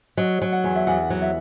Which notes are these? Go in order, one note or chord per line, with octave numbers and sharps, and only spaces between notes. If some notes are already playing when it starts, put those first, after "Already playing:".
F#3 D#5
F#3
F#5
E2
E5
E2 F#5
F#3
E5